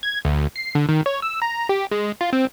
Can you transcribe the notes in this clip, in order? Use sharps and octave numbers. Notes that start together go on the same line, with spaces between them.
G#6
D2
C7
D3
D#3
C#5
E6
A#5
G4
G#3
F4
C4